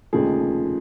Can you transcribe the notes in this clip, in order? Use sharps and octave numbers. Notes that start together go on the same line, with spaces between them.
F1 D#2 C#3 F3 G#4